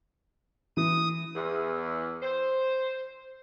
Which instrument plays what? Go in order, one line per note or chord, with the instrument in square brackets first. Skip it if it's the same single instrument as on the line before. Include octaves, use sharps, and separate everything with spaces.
[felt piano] E3 [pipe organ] D#6
[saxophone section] E2
C5